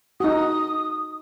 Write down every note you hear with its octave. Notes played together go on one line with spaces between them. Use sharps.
D#4 F#4 D#6